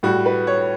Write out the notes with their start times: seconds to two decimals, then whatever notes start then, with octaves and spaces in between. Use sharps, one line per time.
0.03 A2 G3 F#4
0.26 B4
0.47 C#5